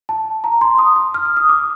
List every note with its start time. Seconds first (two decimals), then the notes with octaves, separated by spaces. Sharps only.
0.09 A5
0.44 A#5
0.61 C6
0.79 D#6
0.96 D#6
1.14 F6
1.25 F6
1.37 D#6
1.49 D6